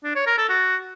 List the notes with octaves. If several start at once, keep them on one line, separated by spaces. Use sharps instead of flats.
D4
C#5
A#4
A4
F#4